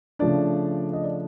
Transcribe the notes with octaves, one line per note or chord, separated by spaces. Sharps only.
C#3 F3 A3 D4 D5
D#5
D5